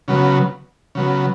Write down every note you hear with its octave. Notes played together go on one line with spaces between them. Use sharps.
C#3 F#3 B3
C#3 F#3 B3